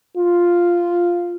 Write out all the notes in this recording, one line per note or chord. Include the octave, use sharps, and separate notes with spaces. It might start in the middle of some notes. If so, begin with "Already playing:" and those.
F4